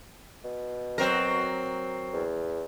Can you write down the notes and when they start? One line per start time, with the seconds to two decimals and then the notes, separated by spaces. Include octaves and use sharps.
0.44 B2
0.98 F#3 C4 A#4
2.13 E2